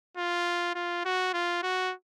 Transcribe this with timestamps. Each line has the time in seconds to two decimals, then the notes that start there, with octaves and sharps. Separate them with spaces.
0.17 F4
0.75 F4
1.05 F#4
1.34 F4
1.63 F#4